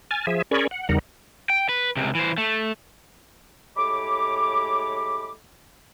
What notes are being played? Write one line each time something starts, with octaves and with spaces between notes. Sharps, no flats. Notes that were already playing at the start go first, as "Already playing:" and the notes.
G#5 F6 A6
F3 G#4 E5
C#4 G#4 A#4 D5 B5 C#6
F#5
E2 C#3 G3 D#4 A#4 F#5
G5
B4
C#2 C3
E3 C5
A3
A2 G#3 G4 C#5 B5 D6